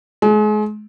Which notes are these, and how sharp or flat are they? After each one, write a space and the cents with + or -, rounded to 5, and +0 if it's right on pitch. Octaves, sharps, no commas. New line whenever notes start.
G#3 +35